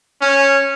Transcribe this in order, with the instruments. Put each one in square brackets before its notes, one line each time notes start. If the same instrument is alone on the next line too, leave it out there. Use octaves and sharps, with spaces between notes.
[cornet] C#4